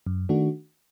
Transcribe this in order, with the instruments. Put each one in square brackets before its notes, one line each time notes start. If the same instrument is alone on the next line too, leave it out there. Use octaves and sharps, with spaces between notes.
[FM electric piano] F#2
D#3 A3 D4 F#4